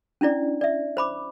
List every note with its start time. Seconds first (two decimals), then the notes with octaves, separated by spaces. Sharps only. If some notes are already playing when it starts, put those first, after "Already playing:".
0.21 C#4 D4 E4 D5
0.61 D5 E5
0.97 C5 B5 D6